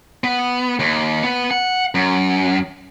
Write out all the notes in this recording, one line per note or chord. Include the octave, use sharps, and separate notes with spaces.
B3
D#2
B3
F#5
F#2